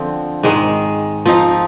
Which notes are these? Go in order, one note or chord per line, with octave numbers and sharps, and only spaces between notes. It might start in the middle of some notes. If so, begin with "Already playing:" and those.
Already playing: D3 F3 C4
G#2 D#3 G#3
F3 C4 D#4